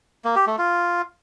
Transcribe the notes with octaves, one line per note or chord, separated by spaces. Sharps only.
A#3
G4
A3
F4